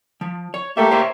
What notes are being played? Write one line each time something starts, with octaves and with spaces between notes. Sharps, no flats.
F3
C#5
A3 A#3 G4 A4 E5
C5 C#5 E5